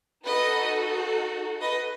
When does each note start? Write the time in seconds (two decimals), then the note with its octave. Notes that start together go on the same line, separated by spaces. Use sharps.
0.23 D#4 F#4 A4 B4 D#5
1.60 B4 D#5